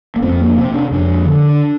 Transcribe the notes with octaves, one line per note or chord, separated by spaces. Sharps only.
A#3
F2 C4
A#3
D4
C3 C4
D4
F2 D4
D3